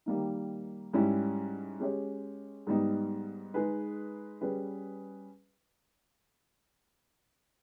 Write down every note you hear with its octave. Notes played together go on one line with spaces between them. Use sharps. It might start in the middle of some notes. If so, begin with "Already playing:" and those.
D#3 G3 A#3 D#4
G#2 G3 C#4 E4
G#3 C#4 G4 C#5
G#2 G3 B3 D#4
G#3 D#4 G#4 B4
G3 C#4 G#4 B4